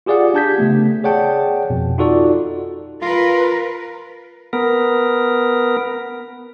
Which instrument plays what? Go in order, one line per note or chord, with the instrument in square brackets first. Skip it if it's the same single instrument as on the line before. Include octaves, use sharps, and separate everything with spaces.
[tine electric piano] F4 G4 G#4 D5 F5 F#5
D4 G4 A5 G6 G#6 B6
C#3 A3 B3
G#4 C#5 D5 F#5 G5 A5
F2 B2
D#4 F4 F#4 A4 D5
[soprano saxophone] F4 [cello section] A#4 B4
[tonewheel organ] B3 A#4